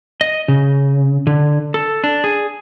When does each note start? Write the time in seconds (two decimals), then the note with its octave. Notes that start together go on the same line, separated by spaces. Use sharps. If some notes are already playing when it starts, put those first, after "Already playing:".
0.21 D#5
0.48 C#3
1.27 D3
1.74 A4
2.04 D4
2.24 G#4